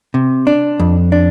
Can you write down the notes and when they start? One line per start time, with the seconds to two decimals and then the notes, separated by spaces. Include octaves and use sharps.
0.14 C3
0.47 D4
0.79 F2
1.12 D4